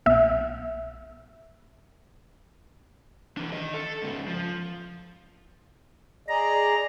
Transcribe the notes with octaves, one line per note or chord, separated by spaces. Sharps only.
B1 E5
E3 D4
D#3 D#5
A4
G#2 C#3
F3
G#4 D5 D#5 A#5